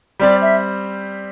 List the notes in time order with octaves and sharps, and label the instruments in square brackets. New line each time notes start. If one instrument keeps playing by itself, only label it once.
[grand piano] G3 C4 G4 [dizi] D5
[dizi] E5